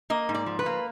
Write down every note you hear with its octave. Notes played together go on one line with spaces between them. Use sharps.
A#3 D#5
G#2
D5
F3
B4
A#3